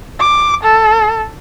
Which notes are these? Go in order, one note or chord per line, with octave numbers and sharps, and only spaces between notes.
D6
A4